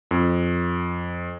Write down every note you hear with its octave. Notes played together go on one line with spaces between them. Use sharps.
F2